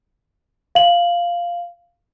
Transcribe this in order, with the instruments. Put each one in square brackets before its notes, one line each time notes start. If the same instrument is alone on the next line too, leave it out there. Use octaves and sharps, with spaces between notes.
[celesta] F5 F#7